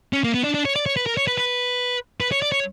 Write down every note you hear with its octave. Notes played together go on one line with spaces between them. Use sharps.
C#4
A#3
B3
D4
D4
C#5
D5
C#5
B4
A#4
C#5
B4
B4
B4
C#5
D5
C#5